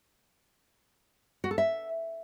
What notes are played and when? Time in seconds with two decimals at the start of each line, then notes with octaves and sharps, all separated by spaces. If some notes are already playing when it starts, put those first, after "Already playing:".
1.44 F#4
1.51 A4
1.58 E5